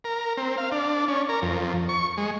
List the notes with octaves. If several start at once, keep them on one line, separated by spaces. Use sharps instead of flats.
A#4
C4
F5
D4
C#4
A#4
F2
C#6
G#3